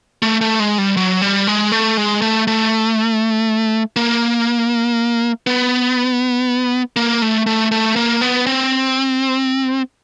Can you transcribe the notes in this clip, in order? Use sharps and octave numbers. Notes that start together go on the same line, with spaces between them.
A3
A3
G#3
G3
F#3
G3
G#3
A3
G#3
A3
A3
A#3
B3
A#3
A3
A3
A3
A#3
B3
C4